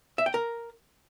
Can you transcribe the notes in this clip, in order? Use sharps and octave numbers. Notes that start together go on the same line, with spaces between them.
E5
G5
A#4